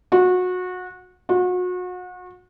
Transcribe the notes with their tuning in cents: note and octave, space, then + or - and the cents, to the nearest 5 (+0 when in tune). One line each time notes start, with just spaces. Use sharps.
F#4 -25
F#4 -35